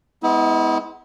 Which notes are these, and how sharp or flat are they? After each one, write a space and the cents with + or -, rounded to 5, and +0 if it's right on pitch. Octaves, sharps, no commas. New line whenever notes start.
G#3 +0 B3 +15 E4 -35